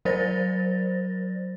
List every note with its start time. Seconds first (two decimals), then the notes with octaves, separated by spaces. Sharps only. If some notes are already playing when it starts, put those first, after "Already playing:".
0.05 F#3 A#4 C5 D5 A6 A#6